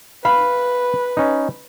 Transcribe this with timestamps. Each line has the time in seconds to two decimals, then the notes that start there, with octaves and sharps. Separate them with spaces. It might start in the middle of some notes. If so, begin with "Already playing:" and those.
0.25 B4 F5 B5
1.17 C#4 D#4